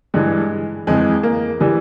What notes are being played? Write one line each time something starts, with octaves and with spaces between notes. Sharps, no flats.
G2 E3 G#3
F2 E3 G#3
A#3
E3 G3